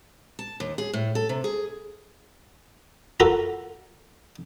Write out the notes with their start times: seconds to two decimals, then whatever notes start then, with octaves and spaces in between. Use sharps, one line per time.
0.39 A5
0.60 D#2
0.78 G#4
0.93 A2
1.15 A4
1.29 C3
1.44 G#4
3.20 F4 F#4 A4 A#4